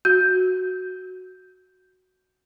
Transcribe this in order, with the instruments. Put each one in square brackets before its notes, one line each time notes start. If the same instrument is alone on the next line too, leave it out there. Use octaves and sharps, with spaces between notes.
[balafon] F#4 [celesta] G6